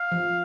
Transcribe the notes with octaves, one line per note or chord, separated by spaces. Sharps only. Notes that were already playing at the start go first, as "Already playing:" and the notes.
Already playing: F5
F3